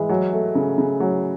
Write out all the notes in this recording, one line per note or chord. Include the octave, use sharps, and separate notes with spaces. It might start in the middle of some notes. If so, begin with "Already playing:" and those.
Already playing: E3 G#3
F#3
A3
C#3
C#3
F#3